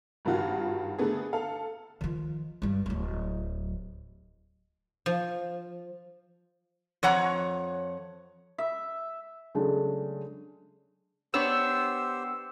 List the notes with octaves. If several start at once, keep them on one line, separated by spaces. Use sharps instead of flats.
G#1 G2 D#3 F4 F#4
D3 A3 B3 G#4
A4 F5
D#3 F3
G2 G3
D1 F#3
F3
F2 C#5 F#5 A#5
E5
C#3 F#3 G#3 A3 D4
B3 D4 G4 C5 C#5 E6